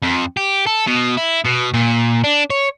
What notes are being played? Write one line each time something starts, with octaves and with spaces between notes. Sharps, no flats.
F2
G4
A4
B2
E4
B2
A#2
D4
C#5